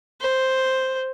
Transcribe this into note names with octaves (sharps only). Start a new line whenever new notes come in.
C5